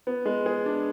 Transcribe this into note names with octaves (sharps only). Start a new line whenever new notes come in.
B3
G#3
G#4
D4